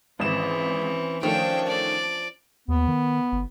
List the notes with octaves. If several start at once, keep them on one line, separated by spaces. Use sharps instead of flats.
G#1 E3 C4 C#4 E7
D#3 F3 A3 C#4 D4 C#5 G5
D5
D#2 B3
D#3
G1